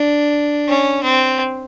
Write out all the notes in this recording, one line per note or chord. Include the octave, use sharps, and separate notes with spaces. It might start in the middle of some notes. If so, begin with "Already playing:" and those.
Already playing: D4
C#4
C4